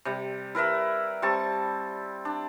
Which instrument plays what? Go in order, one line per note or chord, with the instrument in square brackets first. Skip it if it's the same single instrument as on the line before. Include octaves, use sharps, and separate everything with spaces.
[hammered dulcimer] C3 G3
E4 A#4 B4 E5
G3 C4 A5 C#6
D4